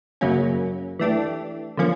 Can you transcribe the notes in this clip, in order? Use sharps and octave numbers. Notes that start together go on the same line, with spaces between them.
F#2 C#3 F#3 A#3 C#4
E3 A3 D4 G4
D3 F3 A#3 C#4